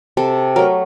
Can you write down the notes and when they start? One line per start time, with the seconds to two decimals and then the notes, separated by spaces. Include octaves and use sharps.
0.17 C3 A4
0.56 F#3 A3 A#4